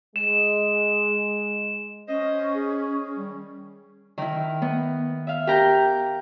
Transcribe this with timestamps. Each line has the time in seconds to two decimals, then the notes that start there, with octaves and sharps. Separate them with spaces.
0.16 G#3 E7
2.08 C#4 C5 D#5
2.55 G#4
3.17 D#3 G3
4.18 D#3 E4
4.62 B3
5.27 E5 F5
5.47 G4 A#4 A#5 G6